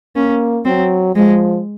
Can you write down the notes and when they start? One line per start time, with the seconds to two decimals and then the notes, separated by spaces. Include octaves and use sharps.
0.16 A#3 C#4
0.65 F#3 C4
1.15 F3 G#3